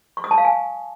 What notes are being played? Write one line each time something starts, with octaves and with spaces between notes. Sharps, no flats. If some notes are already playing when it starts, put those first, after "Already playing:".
C#6
D#6
A5
F5
G#5